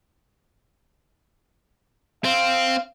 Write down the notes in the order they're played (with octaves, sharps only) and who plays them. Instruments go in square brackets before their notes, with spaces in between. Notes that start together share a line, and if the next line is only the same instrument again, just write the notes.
[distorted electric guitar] C4 [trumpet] F5